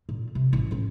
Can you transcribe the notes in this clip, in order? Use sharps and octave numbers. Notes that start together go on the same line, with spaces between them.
A#2
C3
A1 E4
A2 C#4